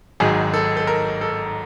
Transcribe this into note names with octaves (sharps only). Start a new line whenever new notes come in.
G#1 G#2 D#3 F#3 G#4
A4
A4
A#4
A4